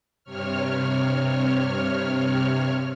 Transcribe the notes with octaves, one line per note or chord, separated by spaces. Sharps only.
G2 C3 C#5 F6